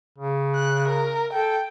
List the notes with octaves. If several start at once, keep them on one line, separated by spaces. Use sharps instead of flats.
C#3
F#6
A#4
A4 G5